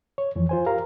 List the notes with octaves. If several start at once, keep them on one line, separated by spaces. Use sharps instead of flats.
C#5
F2 E3 F3
F4 C5 G#5
G4 A#4 F5 A#5